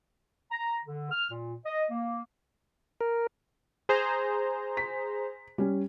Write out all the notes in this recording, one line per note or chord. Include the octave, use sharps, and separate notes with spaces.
A#5
D3
F6
A#2
D#5
A#3
A#4
G#4 C5 A#5
B6
G3 C#4